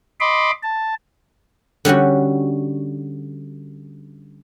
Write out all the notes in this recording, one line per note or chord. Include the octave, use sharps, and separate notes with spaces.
D#5 B5 C6 D6
A5
D3 G3 C#4 F#4